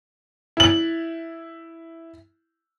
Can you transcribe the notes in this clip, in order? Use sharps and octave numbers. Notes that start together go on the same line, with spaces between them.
E4 F#7